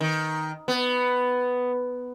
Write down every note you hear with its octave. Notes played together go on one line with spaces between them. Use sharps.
D#3
B3